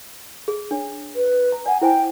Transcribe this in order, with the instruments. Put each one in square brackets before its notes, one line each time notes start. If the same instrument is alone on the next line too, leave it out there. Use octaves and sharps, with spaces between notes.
[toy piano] G#4
D4 C#5
[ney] B4
[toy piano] A#5
[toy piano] D5 F#5 [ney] G#5
[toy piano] E4 C5 G#5 [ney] G5